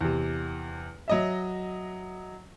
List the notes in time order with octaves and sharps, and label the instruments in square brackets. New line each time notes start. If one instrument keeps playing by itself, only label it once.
[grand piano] E2 C3
F#3 D#5 E5